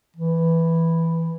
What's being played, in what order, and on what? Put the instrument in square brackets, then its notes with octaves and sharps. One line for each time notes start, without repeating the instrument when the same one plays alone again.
[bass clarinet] E3